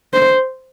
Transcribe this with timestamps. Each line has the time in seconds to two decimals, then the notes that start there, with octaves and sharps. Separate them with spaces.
0.14 C5